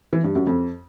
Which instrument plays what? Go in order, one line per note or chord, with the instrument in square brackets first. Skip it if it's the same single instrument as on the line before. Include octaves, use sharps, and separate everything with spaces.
[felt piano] E3
G2
F#2
F2